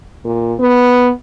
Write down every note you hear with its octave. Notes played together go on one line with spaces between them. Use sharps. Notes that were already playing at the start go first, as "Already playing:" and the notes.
A#2
B3